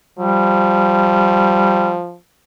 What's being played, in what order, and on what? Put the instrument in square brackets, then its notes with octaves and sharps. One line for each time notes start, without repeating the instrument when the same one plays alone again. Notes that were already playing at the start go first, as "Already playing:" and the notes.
[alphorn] F3 [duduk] G3